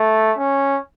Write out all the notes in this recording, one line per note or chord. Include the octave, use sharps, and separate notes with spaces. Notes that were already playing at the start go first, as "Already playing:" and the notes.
Already playing: A3
C#4